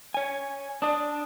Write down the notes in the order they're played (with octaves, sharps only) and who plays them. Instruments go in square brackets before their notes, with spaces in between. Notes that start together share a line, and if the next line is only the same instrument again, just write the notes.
[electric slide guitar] C#5 G#5
[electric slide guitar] D4 D5 [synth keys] A5 D#6